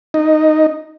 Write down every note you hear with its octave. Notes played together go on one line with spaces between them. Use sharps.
D#4